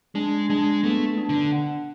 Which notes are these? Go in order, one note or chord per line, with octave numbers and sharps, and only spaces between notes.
G#3 D4
G#3 D4
A3 B3
D4
D3
F#5